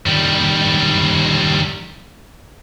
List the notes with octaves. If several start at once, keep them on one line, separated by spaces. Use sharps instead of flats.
D#3 G3